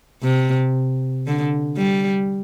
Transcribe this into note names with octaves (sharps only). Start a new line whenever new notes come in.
C3
D3
G3